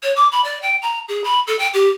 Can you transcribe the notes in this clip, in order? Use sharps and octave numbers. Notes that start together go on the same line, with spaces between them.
C#5
D6
B5
D5
G5
A#5
G#4
B5
A4
G5
G4